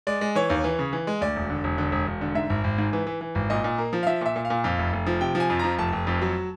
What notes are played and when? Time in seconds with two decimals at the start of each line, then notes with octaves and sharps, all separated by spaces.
0.07 G#3 D5
0.21 G#3
0.35 E3 C#5
0.50 D#2
0.64 E3
0.79 C#3
0.93 E3
1.07 G#3
1.21 D2 D5
1.36 E1
1.50 D3
1.64 E1
1.78 D3
1.92 E1
2.07 E1
2.21 D3
2.35 G#2 E5
2.50 G#1
2.64 G#1
2.78 G#2
2.93 E3
3.07 E3
3.21 E3
3.35 G#1
3.50 A#2 D#5
3.64 A#2
3.78 A#3
3.93 F3
4.03 F5
4.07 F3 E5
4.21 A#2 E5
4.36 A#2
4.45 F5
4.50 A#2
4.64 F2 F5
4.79 F1
4.93 F1
5.06 F3
5.21 C3 G5
5.35 F3
5.40 G#5
5.50 F2
5.59 F3 A#5
5.78 F1 A5
5.93 F1
6.07 F2
6.22 F#3